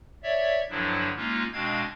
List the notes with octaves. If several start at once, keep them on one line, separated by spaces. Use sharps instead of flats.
C#5 D5 E5
G2 D3 F3 F#3 D4 E4
G#3 A#3 C#4 D#4 F4
B2 G#3 C4 D4 F5 G#6